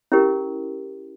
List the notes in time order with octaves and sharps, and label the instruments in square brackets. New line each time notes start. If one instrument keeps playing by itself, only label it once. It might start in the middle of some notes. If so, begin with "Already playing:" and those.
[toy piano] C#4 E4 G4 A#4